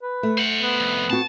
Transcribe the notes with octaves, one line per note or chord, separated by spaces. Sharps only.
B4
A3
C5 F#5
B3
C2 F2
C4 F#4 A5